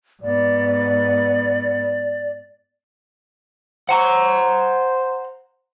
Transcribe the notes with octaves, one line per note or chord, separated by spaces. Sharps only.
G#2 B3 D5
C5 F#5 A#5